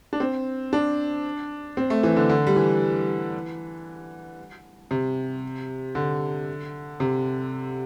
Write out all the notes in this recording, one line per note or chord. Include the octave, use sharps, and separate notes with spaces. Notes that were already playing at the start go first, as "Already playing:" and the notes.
D4
C4
D4
C4
A3
E3
D3
D3
G3
E3
C3
D3
C3